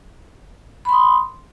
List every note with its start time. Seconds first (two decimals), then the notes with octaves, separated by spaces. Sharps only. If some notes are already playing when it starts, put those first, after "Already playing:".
0.85 B5
0.89 C6
0.93 D#6